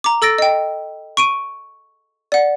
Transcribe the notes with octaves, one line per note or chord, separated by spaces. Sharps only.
A#5 D6
A4 E6 A6 A#6 D7
D#5 G5
C#6 D7 D#7
D5 F#5